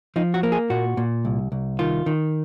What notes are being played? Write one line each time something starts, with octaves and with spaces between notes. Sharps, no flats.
F3 D#4
F#4
A#3
G#4
A#2 F#4
A#2
C2
C2
D#3 F4
D#3